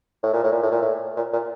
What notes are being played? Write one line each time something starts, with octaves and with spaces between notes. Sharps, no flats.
A2
A#2
A2
A#2
A2
A#2
A2
A#2
A#2